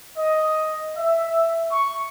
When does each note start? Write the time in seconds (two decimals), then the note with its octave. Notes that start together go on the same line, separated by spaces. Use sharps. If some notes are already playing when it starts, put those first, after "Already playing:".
0.17 D#5
0.95 E5
1.71 C#6